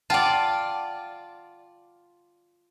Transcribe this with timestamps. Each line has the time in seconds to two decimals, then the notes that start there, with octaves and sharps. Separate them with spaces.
0.10 F4 D5 F#5 G5 A5